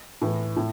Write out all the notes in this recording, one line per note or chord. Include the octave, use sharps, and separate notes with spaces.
A2 E3
A2